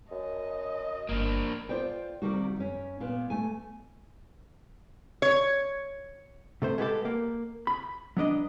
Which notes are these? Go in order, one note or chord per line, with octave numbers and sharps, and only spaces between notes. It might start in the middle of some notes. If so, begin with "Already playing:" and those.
F#2 D#5
G1 A#3 D4
F4 G#4 C5 D5 G5
C3 D#3 G3 A#3 C4 F#4
F#2 C#4
A#2 A#3 B3
A3 G#5
C#5
C3 A3 C5
G#3 B3 G4 A4
A#3
B5
F#3 B3 D4 D#5